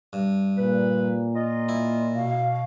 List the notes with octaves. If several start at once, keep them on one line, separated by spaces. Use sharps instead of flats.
G2
A#2 B4
F4 D#5
E4
B2 F5